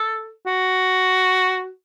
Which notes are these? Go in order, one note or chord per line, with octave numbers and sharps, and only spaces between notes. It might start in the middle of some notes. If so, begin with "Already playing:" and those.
Already playing: A4
F#4